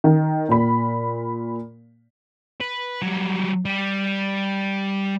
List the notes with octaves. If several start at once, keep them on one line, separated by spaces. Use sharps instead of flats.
D#3
A#2 B5
B4
F#3 G3
G3